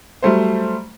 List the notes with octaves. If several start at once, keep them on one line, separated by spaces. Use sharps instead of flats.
F#3 G3 A3 C5